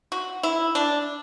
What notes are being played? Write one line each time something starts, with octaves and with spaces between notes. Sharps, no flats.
F#4
E4
D4